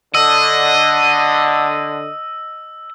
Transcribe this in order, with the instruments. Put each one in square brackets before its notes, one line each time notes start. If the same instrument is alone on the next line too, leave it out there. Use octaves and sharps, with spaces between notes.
[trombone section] D3 [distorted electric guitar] D#5 [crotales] E6